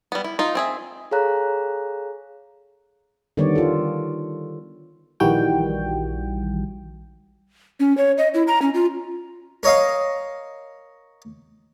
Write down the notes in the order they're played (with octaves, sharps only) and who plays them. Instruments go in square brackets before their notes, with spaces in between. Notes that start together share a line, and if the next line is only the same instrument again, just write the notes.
[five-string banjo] G3 B3
E4
D#4 F4
C4 G#4 E5
[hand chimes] G#4 A4 C#5 F5 A#5 F#6
[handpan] D3 D#3 G3 B3 C#5 D5
F4 A4
[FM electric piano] A#1 D#3 E3 G3 F#4 G5
[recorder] C#4
C#5
D#5
E4
A#5
C#4
F4
[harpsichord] A#4 C#5 D#5 F5